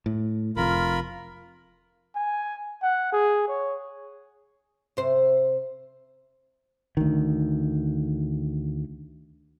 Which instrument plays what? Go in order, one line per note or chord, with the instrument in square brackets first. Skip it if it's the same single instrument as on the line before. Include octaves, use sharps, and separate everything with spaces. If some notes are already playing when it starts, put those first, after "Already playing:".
[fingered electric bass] A2
[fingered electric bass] F1 F2 [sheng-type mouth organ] F4 A#4 B5
[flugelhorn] G#5
F#5
G#4
C#5
[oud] C3 C5
[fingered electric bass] D2 D#3